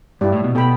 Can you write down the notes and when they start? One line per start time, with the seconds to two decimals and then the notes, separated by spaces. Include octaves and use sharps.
0.21 G2 E4 G4 D5
0.32 A2
0.44 B2
0.55 B2 A4 G5 B5